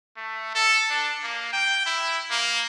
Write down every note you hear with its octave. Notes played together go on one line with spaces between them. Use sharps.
A3
A4
D4
A#3
G5
E4
A#3